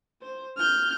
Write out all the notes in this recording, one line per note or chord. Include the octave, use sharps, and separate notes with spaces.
C5
F6 G6